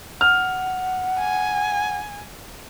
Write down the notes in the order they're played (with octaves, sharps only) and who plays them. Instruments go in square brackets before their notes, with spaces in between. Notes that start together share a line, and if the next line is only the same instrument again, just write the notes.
[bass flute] F#5 [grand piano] F6
[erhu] G#5